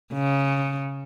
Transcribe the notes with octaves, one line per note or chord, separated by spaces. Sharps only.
C#3